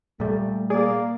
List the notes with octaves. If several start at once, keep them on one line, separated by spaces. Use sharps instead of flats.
A#2 G3 A3
A#3 G#4 D5